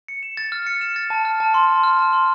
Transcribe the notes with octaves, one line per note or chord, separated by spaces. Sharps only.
C#7
E7
A6
F6
C#7
E7
A6
A5
F6
A5
C6
A5
F6
A5
C6